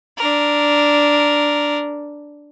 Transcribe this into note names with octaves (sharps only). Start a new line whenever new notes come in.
D4 A#4